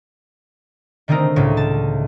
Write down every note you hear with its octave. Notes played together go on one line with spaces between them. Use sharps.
D3 D#3 A3 C4 D#4 A#4
C#2 A2 C#3
A5